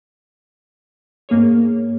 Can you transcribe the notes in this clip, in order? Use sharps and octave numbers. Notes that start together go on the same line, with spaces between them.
G#2 A#3 G#4 C#5